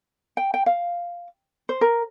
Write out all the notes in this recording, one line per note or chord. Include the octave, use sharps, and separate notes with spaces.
G5
G5
F5
C5
A#4